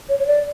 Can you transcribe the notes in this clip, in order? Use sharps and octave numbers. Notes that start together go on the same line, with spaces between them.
C#5
C#5
D5